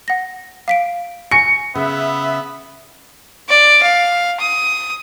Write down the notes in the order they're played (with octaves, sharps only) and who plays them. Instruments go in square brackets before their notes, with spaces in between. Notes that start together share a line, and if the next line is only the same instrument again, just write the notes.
[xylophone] F#5 A#6
F5 B6 D7
[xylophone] G#5 C#6 A#6 [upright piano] C#7
[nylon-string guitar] C#3 [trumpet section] B3 [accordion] E5
[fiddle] D5
F5
D#6